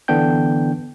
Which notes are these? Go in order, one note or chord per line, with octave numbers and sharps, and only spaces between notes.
D3 E3 B3 D4 G5 G6